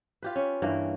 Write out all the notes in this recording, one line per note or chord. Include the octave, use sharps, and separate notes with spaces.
F4 G4 B4
C#4
G2 E3 A#3